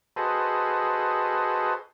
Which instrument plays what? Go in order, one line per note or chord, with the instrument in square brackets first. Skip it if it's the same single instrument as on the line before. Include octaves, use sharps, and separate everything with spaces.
[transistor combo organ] F#4 G#4 A4 B4 C5 D#5